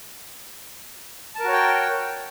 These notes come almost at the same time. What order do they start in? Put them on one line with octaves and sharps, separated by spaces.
A5 A#4 F#4 C#5 G5